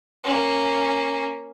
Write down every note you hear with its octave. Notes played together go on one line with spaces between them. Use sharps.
A#3 C#4